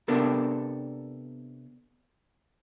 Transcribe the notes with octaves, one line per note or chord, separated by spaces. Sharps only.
C3 B3 D4 A4 A#4